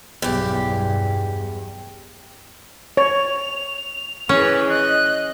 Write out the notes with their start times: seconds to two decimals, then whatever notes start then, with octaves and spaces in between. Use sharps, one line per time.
0.22 B1 E2 G2 G4
2.97 C#5 F7
4.29 E3 C#4 G#4 B4
4.69 D#5 F#6